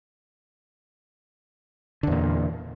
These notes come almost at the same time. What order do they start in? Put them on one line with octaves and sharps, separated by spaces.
D3 E2 A#2